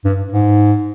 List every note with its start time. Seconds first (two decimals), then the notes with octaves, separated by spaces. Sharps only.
0.05 G2
0.32 G#2